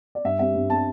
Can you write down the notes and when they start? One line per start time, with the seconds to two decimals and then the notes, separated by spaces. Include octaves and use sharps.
0.15 D5
0.25 G2 E5
0.39 G3 C4 E5
0.55 G2
0.70 G3 C4 A5